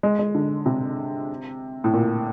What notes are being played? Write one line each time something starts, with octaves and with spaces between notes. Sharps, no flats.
G#3
G#3
D3
C3
A2
A#2